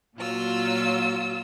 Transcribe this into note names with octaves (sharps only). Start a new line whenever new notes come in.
A#2 F#3 F4 E6